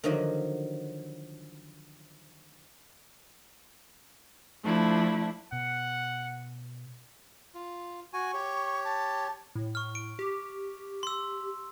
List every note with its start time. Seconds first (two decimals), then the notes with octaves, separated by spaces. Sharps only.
0.04 D3 D#3 F3 F#3 F#4 D#5
4.63 F3 A3 D4 E4
5.52 B2 F#5
7.55 F4
8.13 F#4 G#5 C#6
8.34 G4 C#5
8.84 A5
9.56 A2
9.75 C#6 F6
9.95 D7
10.19 G4
11.03 C6 E6